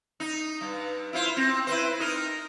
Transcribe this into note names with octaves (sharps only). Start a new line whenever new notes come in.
D#4
G2
E4 F4 C5
C4
E4 B4 C5
D#4 A#4 D#5